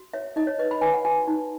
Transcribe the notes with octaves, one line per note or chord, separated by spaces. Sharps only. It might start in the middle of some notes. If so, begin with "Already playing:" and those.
Already playing: F#4
C#5 E5
D#4 D#5
C#5
B4 D#5
B5
B4 G#5
F#5
F#4 G#5
D#4